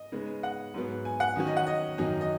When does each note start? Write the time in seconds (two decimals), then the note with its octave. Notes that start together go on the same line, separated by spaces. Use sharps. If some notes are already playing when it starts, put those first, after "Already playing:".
Already playing: D#5
0.12 C#3 G#3 B3 D#4
0.43 F#5
0.74 G#2 F#3 B3
1.05 G#5
1.20 F#5
1.36 D#3 F#3 C#4
1.47 D#5
1.57 F#5
1.67 D#5
1.98 F#2 D#3 F#3 D#4
2.21 D#5